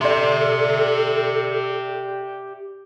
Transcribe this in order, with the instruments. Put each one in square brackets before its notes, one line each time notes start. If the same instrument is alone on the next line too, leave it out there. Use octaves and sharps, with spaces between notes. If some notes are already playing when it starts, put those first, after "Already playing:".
[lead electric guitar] G4 E5 [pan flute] A4 [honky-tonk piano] D5 C6